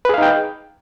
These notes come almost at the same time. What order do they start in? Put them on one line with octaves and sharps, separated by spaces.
B4 G#4 F5 D#4 G5